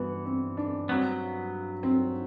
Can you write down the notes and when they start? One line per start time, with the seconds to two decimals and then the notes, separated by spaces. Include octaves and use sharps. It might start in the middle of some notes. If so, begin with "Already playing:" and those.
Already playing: G2 E3 B3 F#4
0.26 C4
0.57 D4
0.88 G2 F#3 B3 C4
1.83 C4